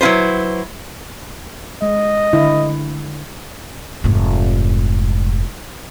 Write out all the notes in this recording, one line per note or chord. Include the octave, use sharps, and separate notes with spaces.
F#3 E4 F4 B4 C5
G#3 D#5
D3 E4
F1 G#2